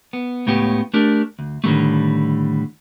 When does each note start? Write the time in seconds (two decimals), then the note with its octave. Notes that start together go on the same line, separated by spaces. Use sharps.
0.13 B3
0.46 C#2 A2 C#3 B3 G4
0.94 A3 D4 G4 A#4 D5
1.39 D2
1.64 A2 D3 D#3 G3 A3